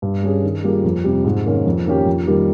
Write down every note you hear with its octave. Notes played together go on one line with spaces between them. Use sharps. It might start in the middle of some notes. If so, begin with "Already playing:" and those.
G2
G3 C#4 G#4
D#3
G3 A#3 F4 G#4
F2
C3 G3
G#2
D#3 A#3 C#4
F2
D#3 A#3 C#4 G4
F2
D#3 G3 A#3